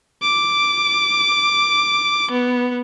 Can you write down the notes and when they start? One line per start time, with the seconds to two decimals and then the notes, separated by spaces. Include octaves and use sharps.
0.22 D6
2.31 B3